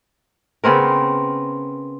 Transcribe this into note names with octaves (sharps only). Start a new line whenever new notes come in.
C#3 B3 C4 A#4